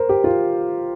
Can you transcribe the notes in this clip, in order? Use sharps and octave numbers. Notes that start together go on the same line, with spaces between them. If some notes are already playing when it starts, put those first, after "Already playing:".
Already playing: A#4 C5
G4
F4